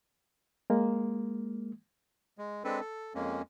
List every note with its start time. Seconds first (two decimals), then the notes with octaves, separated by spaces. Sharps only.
0.70 G#3 A#3
2.38 G#3
2.64 G#3 C4 D4 A4 B4
2.81 A4
3.15 F2 G#3 A#3 C#4